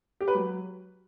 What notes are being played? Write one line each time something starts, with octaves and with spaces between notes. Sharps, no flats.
G4
B4
F#3